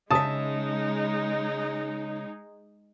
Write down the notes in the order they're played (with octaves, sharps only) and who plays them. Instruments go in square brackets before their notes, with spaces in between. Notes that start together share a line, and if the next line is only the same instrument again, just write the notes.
[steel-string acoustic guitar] C#3 E5 [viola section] G#3 D#4 [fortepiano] A5 D#6